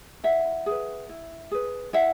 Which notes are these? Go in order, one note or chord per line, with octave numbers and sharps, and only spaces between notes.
E4 E5 F#5
G#4 B4
E4
G#4 B4
E4 E5 F#5